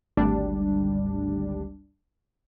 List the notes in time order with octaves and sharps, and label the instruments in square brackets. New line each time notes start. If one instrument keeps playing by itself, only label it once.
[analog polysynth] G#1 D2 G3 D4